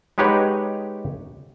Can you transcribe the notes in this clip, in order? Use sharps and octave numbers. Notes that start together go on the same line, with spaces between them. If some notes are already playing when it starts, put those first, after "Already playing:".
G#3 D#4 G4 B4 C#5 F#5